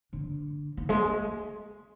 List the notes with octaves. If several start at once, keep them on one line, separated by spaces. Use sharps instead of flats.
D3
D#3
G#3